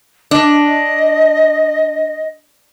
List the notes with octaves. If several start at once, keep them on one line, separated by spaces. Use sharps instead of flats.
D4 D#5